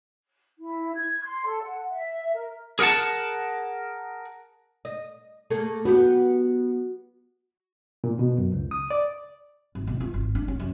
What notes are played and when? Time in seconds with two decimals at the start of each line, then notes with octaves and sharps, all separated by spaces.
0.59 E4
0.95 G#6
1.24 C6
1.46 A4
1.61 F#5
1.90 E5
2.34 A#4
2.79 G#4 A#4 F5 F#5 A5
4.85 D#5
5.50 A3 A#3 G#4
5.85 B3 F#4 G4
8.04 A#2
8.19 B2
8.38 F#2
8.53 C#2
8.71 D#6
8.90 D5
9.75 G#1
9.87 B2
10.00 F4
10.14 G#1
10.35 D4
10.48 C#4
10.60 F#2